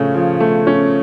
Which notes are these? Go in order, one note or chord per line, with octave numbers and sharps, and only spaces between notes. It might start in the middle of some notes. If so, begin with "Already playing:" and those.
Already playing: C#3 F3 A3 C#4
F3
A3
C#4